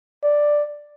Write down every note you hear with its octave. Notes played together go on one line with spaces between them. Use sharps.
D5